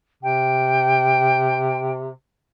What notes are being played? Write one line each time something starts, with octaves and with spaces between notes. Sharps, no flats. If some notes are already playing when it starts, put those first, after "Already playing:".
C3 G5